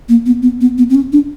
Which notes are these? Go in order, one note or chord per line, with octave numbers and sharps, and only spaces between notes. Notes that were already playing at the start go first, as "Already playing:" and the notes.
A#3
B3
B3
B3
B3
C4
C#4
D4